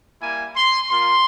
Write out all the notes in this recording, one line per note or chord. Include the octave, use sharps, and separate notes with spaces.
G3 A#3 E4 G#5
C6
A#3 F4 C6